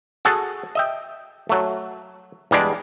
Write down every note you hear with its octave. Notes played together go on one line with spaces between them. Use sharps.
F#4 G#4 A4
D#5 E5 G5
F#3 A3
E2 G3 G#3 D4